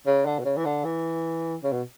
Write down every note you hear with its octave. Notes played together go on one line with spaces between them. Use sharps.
C#3
D3
B2
C#3
E3
D3
E3
C#3
B2